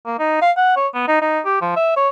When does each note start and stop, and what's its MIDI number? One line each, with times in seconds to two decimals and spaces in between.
0.06 0.16 58
0.19 0.41 63
0.42 0.51 77
0.57 0.76 78
0.77 0.88 73
0.95 1.08 59
1.08 1.18 63
1.22 1.40 63
1.45 1.59 67
1.62 1.72 53
1.76 1.95 76
1.97 2.09 73